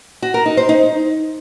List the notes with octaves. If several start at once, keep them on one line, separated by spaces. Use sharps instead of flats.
F#4
A#4
D#4
C5
D#4